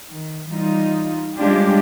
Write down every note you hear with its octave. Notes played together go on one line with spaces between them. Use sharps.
D#3
E3 G3 D#4 F4
G3 G#3 C#4 D4 F4 G4